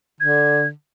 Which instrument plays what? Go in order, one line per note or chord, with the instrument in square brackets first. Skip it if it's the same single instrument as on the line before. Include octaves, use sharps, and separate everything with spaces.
[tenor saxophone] D3 [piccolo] G#6